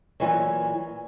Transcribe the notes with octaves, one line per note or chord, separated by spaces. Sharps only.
A#2 E3 F#3